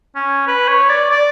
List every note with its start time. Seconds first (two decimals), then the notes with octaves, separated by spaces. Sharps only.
0.16 C#4
0.48 B4
0.68 C#5
0.89 D5
1.11 D5